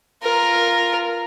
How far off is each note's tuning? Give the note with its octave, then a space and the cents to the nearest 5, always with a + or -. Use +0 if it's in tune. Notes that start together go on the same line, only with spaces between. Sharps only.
F4 -5 A#4 +0